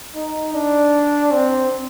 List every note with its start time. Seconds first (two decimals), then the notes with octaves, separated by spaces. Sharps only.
0.15 D#4
0.54 D4
1.32 C4